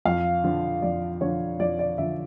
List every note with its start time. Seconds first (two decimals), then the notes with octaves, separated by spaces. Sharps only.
0.05 F2 F5
0.44 D3 F3
0.82 F2 D5
1.21 D3 F3 C#5
1.59 F2 D5
1.79 D5
1.98 D3 F3 E5